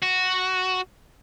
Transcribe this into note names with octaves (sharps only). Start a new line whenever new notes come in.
F#4